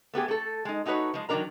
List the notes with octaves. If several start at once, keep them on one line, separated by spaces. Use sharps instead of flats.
A3 B3 G4 G#4
A3 A4
G#3 D#4
A3 D#4 F#4 B4 C#5
F3 G#3
D#3 F#3 C4 D4 A#4 A#5